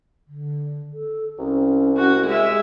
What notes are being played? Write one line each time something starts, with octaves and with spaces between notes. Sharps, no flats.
D3
A4
C2 C#4
F#4
G#3 G4 E5